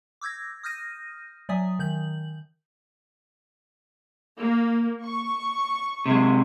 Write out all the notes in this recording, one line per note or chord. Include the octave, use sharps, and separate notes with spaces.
D6 E6 G6 G#6 A#6
D#6 F6 G6 A#6 D#7
F#3 D5 E5 G#5 D#6
D#3 G6 F#7
A#3
C#6
C3 G#3